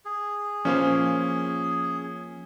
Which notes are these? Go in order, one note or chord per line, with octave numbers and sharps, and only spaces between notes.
G#4
F3 A#3 C#4 C5